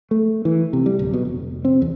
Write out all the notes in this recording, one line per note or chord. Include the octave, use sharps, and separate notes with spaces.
A3
E3
C3
G3
D1
B2
F1
C4
E2